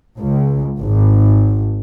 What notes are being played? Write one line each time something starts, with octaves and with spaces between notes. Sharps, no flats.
C#2
G#1